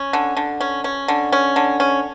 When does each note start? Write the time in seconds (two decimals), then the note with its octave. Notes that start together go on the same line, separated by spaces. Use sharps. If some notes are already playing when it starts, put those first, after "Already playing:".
Already playing: C#4
0.13 D3
0.37 D3
0.61 C#4
0.84 C#4
1.08 D3
1.32 C#4
1.56 D3
1.80 C#4